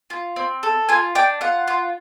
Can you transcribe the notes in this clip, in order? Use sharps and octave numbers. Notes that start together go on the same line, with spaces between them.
F4
C4
A4
F4 G#5
D4 G5
F4 F#5
F4